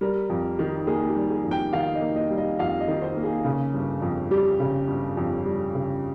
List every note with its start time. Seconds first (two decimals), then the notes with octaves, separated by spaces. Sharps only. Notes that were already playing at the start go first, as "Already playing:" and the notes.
0.01 G3 A#4
0.29 F2
0.59 D#3
0.87 A#3 G#4
1.08 G4
1.16 G3
1.30 G#4
1.44 F2
1.51 G5
1.73 D#3 F5
1.95 D#5
2.01 A#3
2.16 D#5
2.31 G3
2.38 D#5
2.59 F2 F5
2.80 D#5
2.88 D#3
3.02 C5
3.17 A#3
3.24 G#4
3.44 C#3
3.74 G1
4.02 F2
4.31 G3 G4
4.60 C#3
4.88 G1
5.17 F2
5.46 G3
5.74 C#3